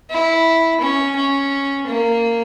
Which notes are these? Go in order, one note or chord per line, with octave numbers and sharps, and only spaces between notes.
E4
C#4
C#4
A#3